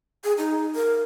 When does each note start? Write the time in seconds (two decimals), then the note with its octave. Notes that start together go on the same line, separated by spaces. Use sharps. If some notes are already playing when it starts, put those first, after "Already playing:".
0.24 G#4
0.38 D#4
0.76 A#4